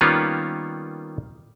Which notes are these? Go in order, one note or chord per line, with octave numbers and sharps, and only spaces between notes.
D#3 G3 A#3 B3 C#4 F4